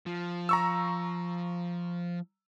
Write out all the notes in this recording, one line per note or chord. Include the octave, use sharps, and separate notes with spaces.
F3
A#5 C#6 E6